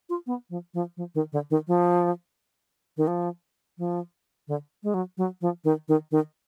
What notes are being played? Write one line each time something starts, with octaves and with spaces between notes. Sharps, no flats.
F4
B3
F3
F3
F3
D#3
D3
D#3
F3
D#3
F3
F3
D3
G#3
F#3
F#3
F3
D#3
D#3
D#3